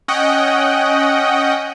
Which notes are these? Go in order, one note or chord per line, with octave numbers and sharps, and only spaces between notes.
C#4 D#5 F#5 G5